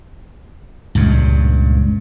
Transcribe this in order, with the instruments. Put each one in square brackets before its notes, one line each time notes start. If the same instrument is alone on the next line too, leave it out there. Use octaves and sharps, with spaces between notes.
[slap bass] C#2 G2 A#2